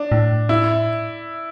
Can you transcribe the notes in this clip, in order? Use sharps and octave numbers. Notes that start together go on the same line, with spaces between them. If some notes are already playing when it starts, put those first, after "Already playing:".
Already playing: D4
A2
E4